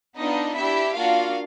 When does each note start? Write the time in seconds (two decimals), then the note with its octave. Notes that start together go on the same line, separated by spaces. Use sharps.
0.17 B3 D4 D#4 F4 D#5
0.56 D4 E4 G4 E5
0.95 A#3 D4 F4 F#4 F5